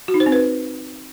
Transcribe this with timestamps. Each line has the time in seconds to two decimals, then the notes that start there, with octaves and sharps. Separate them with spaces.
0.08 F#4
0.14 D#4
0.20 C5
0.26 C4
0.32 B4